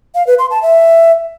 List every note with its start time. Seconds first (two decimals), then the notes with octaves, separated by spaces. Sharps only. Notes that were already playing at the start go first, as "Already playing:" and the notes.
0.15 F5
0.27 B4
0.39 C6
0.50 A5
0.62 E5